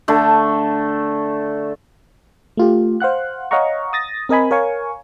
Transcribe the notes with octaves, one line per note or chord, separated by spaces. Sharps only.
D3 A3
A3 F4 G4
C5 F5 F#5 F#6
C#5 D#5 F5 F#5 A#5 C#6
D#6 A6 A#6
C4 A#4 D#5 G#5 B5
A#4 C#5 F5 G#5 C#6